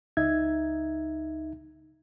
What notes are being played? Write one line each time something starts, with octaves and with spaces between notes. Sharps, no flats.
C#2 D#4 E5 G#6